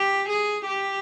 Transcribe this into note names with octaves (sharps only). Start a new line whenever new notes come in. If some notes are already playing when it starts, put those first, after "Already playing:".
Already playing: G4
G#4
G4